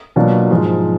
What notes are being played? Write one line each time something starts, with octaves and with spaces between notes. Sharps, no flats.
B2 F#3 A#3 D4 F4
G#2 F3 G#3